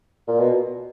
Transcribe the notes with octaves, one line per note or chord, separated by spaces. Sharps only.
A#2
B2